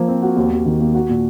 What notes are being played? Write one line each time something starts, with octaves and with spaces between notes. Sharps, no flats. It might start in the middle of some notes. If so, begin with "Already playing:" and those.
Already playing: F3 A#3 A#4
C4
F#4
D#2
D#2
D#3
A#3
F#4
A#2